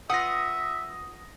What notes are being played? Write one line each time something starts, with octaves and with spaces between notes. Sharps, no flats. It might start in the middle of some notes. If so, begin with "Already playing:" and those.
F4 B4 E5 F#5 D#6 A#6